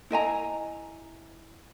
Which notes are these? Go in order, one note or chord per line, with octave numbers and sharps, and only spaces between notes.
E4 D#5 G#5 A#5